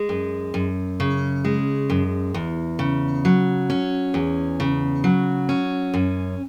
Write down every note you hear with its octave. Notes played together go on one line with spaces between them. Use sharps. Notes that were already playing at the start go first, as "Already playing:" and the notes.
Already playing: G#3
F#2
F#2
C#3
G#3
F#2
E2
C#3
F#3
C#4
E2
C#3
F#3
C#4
F#2